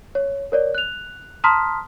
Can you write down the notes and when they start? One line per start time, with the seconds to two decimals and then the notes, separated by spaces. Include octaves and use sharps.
0.15 C#5
0.52 A#4 C#5 D5
0.75 F#6 F7
1.44 A5 A#5 C6 D#6 F6 B6